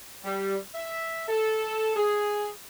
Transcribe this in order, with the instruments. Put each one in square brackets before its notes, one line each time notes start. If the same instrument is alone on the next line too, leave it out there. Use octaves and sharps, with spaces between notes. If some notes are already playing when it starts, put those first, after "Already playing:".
[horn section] G3
E5
A4
G#4